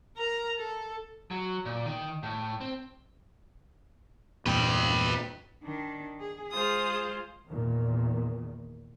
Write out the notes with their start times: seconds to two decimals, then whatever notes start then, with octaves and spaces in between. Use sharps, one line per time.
0.17 A#4 A#5
0.58 A4
1.31 F#3
1.65 A#2
1.85 D#3
2.23 A2
2.61 C4
4.46 E2 G2 A#2 B4 G5
5.64 D#3 D4
6.20 G#4
6.51 G#3 F4 G#4 C5 D#6
7.47 E2 A#2 D#3